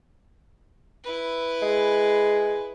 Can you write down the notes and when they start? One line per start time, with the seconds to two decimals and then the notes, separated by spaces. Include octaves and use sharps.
1.04 E4 B4
1.62 G#3